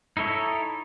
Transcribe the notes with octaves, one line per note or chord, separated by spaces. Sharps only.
D#4 E4 A4 C#5